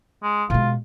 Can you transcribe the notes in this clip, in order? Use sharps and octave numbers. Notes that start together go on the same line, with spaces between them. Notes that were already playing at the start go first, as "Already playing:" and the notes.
G#3
B2 G#3 F4